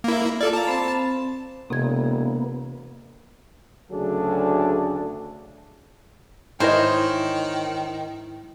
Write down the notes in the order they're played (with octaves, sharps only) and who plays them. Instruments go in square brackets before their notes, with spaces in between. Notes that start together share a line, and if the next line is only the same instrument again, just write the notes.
[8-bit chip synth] A#3 E4
[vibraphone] F4 [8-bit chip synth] A4 D5
[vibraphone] F5 A#5 D6 [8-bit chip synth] A5
[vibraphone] C4 C5 B5
[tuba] E1 [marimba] C3 G#6 [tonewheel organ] A#3 B3
[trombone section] D2 C#3 F#3 D4 G#4 A4
[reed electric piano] G#2 E4 [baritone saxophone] D#3 [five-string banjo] E3 A#4 D#5 [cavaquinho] C5 C#5